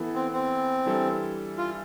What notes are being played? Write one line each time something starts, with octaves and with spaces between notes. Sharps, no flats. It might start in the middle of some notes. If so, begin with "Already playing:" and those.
Already playing: E3 B3 E4 A4
C4
C4
E3 G3 D4 A4
F4